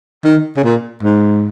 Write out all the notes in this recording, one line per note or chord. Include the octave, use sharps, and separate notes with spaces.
D#3
C#3
A#2
G#2